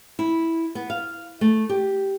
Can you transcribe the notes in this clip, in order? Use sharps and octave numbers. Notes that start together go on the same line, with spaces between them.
E4
B3
F5
A3
G4